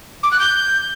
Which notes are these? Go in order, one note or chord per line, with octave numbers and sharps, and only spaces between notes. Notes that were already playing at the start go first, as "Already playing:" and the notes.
D6
F#6
G6